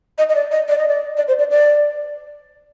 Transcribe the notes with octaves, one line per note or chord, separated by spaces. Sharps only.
D#5
D#5
D5
D#5
D5
D#5
D5
D5
C5
D5
D5